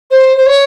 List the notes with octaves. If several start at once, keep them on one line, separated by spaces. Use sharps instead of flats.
C5
C5
C#5